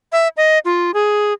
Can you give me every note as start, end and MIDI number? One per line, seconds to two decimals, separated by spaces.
0.12 0.28 76
0.37 0.59 75
0.65 0.91 65
0.94 1.33 68